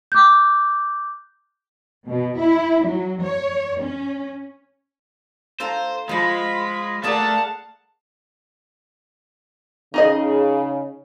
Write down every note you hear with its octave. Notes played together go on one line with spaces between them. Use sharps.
D6 F#6 G6
B2
E4
F#3
C#5
C#4
F4 A4 C5 A#5
F3 G#3 F4 A5 B5
A3 A#3 G#4 D5 F5 F#5 A5
C#3 D#4 G#4 D#5